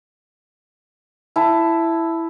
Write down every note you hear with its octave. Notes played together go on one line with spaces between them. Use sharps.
E4 A5